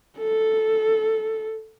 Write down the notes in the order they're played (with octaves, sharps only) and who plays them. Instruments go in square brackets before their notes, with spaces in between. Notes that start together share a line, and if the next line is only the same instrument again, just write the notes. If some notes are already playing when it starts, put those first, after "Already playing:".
[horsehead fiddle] A4